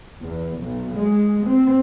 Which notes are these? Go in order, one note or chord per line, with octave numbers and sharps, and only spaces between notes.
E2
B1
G#3
C4